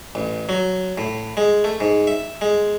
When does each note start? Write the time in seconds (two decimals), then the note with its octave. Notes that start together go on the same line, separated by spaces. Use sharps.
0.15 A1
0.49 F#3
0.98 A2
1.37 G#3
1.64 A3
1.80 G#2
2.07 E5
2.41 G#3